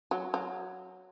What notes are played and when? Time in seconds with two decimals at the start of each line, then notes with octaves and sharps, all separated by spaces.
0.11 F#3
0.34 F#3